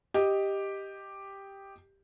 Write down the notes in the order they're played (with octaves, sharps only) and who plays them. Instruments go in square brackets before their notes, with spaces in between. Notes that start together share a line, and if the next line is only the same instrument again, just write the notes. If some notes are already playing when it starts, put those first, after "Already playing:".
[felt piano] G4 D#5